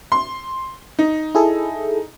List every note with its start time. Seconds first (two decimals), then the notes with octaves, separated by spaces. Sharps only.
0.12 C6
0.99 D#4
1.35 E4 G#4 A4